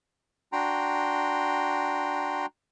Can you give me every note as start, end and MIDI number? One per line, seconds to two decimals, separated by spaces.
0.53 2.46 62
0.53 2.46 66
0.53 2.46 79
0.53 2.46 82
0.53 2.46 84